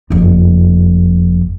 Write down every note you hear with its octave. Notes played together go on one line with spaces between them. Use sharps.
F#1 F2